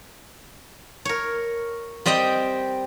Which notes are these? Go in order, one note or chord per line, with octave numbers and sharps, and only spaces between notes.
A#4 C#5
G3 C4 G4 D#5 G5